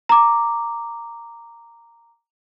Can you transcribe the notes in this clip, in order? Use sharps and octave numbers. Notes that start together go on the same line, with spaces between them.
A#5 D6